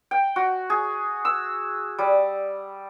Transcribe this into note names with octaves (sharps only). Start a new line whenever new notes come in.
G5
F#4
G#4
E6
G3